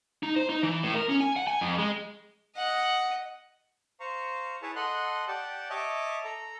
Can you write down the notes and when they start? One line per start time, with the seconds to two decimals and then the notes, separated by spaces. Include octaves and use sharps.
0.23 D#4
0.36 C5
0.49 D#4
0.63 E3
0.83 A2
0.95 A#4
1.09 C#4
1.20 G#5
1.36 F#5
1.47 G#5
1.61 F2
1.78 G#3
2.56 D#5 F#5
4.00 C5 F5 A#5 C#6
4.62 E4 G#4 B4 C#5 E5 A5
4.76 A4 D#5 F#5 C6 F#6
5.28 G4 D5 F#5 G5 A5
5.70 C#5 D#5 E5 A5 D6
6.24 A4 A#5